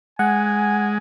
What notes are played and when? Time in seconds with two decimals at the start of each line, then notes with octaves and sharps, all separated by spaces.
0.19 G#3 F#5 G#5